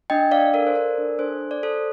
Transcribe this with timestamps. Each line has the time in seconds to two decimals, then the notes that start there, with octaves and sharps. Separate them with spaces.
0.10 D4 D#5 G5
0.31 D4 D5 F5
0.54 A4 A#4 D5
0.67 C5
0.75 A4 A#4 D5
0.98 D4
1.19 D4 A4 C5
1.41 A4
1.51 D5
1.63 A4 C5